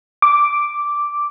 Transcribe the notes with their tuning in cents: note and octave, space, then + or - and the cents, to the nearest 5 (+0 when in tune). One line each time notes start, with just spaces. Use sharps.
D6 -5